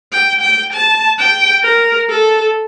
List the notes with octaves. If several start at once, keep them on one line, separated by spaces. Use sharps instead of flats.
G5
G5
A5
G5
A#4
A4